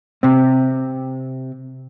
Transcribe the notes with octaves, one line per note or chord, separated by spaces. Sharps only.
C3 C4